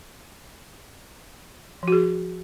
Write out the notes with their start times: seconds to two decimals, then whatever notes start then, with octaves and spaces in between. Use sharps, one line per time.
1.83 F3
1.88 F#4
1.92 G#4